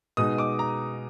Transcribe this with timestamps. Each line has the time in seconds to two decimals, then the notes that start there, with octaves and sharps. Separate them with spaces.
0.17 B2 G#3 D#4 D#6
0.38 D6
0.59 A#5